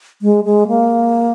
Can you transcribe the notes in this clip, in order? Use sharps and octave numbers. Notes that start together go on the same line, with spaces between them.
G#3
G#3
A#3